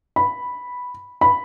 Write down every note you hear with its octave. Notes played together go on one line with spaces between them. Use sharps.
B5
B5